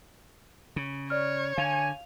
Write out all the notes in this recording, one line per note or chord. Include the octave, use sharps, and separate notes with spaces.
C#3
C#5 D5 F6
D3 F5 G#5 F7